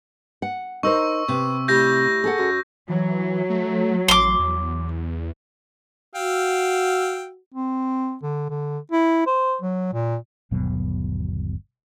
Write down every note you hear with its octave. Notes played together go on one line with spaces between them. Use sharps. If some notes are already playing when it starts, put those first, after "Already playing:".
F#5
D#4 A#4 C5 C#6 E6
C3 B3
A2 G3 A3 G6 A#6
G#4 A4 F#5
F#2
E3 F#3
A3
A1 C6 D6
E2
F#4 F5 G5 E6
C4
D3
D3
E4
C5
F#3
A#2
G1 D#2 B2 F#3